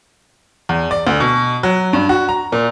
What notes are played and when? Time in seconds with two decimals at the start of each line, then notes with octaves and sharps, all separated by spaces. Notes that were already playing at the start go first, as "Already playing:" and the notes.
0.69 E2
0.91 D5
1.07 D2
1.20 B2
1.63 F#3
1.93 G2
2.09 F#4
2.29 A#5
2.52 A#2